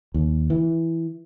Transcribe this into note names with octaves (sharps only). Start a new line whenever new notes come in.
D#2
E3